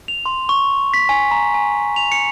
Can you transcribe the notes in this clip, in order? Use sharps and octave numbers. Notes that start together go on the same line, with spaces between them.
F7
C6
C#6
B6
G#5
A#5
G#5
F7
C#7